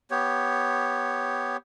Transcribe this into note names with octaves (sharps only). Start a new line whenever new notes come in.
B3 G4 C#5